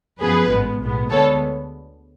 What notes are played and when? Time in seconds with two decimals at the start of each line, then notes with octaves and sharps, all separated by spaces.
0.21 F#2 F3 B3 G#4 B4
0.51 A1 G#2 G#3 B3
0.81 B1 A2 G#3 B3
1.11 D2 D3 G#3 B3 A4 C#5